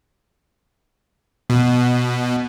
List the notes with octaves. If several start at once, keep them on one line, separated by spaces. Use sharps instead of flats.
B2